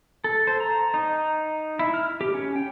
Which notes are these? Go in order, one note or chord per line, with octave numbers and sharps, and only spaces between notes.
A4
C5
A#5
D#4
E4
F6
G4
C#4
G5